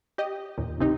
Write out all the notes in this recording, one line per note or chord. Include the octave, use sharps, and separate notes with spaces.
G4 D#5
D#2 A#2
G1 C#2 C3 D#4 G4